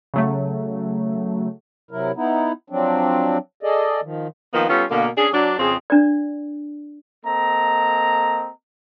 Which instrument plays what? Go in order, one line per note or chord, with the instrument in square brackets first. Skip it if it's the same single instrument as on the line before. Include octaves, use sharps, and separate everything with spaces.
[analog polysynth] C#3 F#3 A3
[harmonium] C3 F#3 E4 A#4
B3 D#4 E4
F3 F#3 C4 D4
G#4 A4 D5 D#5
D#3 F3
[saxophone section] D#3 F3 A#3 B3 D#4
G3 B3 C#4 F4 A4
B2 D3 A#3
C#4 D4 G#4
F#3 D4
F2 C#3 C4 G#4
[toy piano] D4 D5
[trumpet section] A#3 C4 A4 D#5 A#5